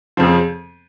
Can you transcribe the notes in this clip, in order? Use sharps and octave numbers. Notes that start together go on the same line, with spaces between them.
F2 C#3 F3 C4